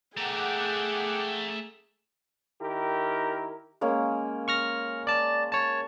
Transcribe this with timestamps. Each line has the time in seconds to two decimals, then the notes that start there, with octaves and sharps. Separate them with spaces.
0.17 A3 G#4 A#4 F#5 G5 D6
2.60 D#3 E4 G4 A#4
3.81 G#3 A#3 C#4
4.48 C#6 F6 A#6
5.07 D5 A5
5.52 C#5 A5